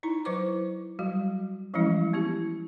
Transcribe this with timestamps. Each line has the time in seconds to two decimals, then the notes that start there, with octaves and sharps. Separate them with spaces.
0.03 D#4 E4 A#5
0.25 F#3 E4 B4 C5 C#6 D6
0.99 F#3 G3 F#4
1.74 E3 F3 G3 G#3 C#4 E4
2.13 B3 E4 G4